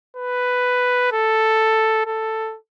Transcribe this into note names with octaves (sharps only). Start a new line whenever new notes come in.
B4
A4
A4